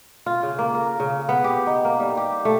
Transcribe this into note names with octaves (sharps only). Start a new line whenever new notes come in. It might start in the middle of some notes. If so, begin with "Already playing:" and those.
F4
C#3
A#3
A#4
C#3
B3
G4
D#4
A#3
G3
G4
A3